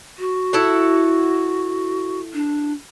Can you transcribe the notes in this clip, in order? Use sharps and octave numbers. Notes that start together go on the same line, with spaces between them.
F#4
E4 A4 F#5
D4